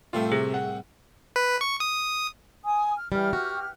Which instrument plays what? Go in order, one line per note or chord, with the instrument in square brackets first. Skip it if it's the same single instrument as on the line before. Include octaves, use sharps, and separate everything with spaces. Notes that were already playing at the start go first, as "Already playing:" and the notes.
[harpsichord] C2 A2 C4 [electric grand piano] A3 F4
[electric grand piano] C3 [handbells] G#4
[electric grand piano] F#5
[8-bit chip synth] B4
C#6
D#6
[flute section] G#5 D#6
F6
[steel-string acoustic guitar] E3 G3 [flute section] G4 F6
[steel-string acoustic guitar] F#4